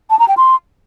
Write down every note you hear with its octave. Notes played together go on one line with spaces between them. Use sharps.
A5
A#5
G5
C6